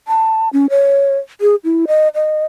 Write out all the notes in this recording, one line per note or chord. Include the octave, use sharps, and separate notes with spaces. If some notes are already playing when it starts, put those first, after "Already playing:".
A5
C#4
C#5
G#4
E4
D#5
D#5